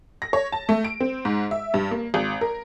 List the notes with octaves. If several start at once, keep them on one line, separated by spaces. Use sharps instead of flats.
A#6
C#5
A5
A3
D7
C4
G#2
E5
G2
A#3
G#1
A#4